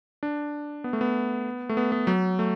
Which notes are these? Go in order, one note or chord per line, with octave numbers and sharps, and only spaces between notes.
D4
B3
A3
B3
A3
B3
B3
F#3
A3